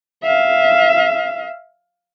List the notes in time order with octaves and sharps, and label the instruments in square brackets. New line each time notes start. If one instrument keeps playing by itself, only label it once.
[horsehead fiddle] E5 F5